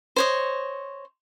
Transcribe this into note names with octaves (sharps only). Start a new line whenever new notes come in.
C5 C#5 D#5